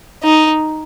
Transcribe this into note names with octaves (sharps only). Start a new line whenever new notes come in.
D#4